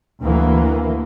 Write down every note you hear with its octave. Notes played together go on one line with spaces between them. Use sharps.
D2 E3 A#3